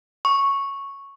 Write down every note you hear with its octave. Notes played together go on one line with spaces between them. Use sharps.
C#6